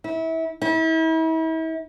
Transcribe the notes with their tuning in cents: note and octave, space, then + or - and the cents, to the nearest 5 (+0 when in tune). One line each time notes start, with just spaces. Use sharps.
E4 -25
E4 -40